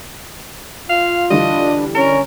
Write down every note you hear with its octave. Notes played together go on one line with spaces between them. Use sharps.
F4 F5
D3 E3 G3 D4 D#5
C#4 A#4